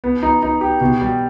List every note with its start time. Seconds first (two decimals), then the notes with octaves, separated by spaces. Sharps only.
0.04 B3
0.23 D#4
0.42 D#4
0.61 G4
0.81 B2
1.01 G3